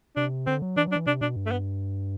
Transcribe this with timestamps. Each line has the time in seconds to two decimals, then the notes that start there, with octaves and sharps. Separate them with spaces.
0.16 C3 D4
0.46 D3 C4
0.62 F#3
0.76 E3 D4
0.87 F#3 D4
0.96 E3
1.07 C3 D4
1.21 B2 D4
1.36 G2
1.46 A3
1.51 B3